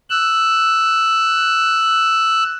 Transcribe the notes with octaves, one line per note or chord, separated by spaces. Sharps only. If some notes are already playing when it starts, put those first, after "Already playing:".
E6 F#6